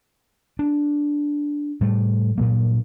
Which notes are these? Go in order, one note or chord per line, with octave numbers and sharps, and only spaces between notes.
D4
A2 G3 A3
G2 A#2 F#3 A#3